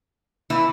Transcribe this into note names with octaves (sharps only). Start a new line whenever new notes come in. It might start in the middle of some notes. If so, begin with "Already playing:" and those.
E3 E4